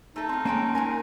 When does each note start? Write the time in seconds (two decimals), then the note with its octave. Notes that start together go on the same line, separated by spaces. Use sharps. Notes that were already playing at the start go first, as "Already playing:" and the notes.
0.16 A3 D#4 A4
0.29 C4 F5
0.45 G#3 A#3 C#4 G5 A5
0.75 A#2 A#4 G#5